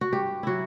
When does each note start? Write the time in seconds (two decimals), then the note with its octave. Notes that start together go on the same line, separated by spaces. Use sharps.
0.01 F#4
0.12 G2 G4
0.43 F#3 E4 F#4